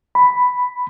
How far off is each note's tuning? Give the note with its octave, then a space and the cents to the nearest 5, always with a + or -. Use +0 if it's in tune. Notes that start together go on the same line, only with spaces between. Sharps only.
B5 +5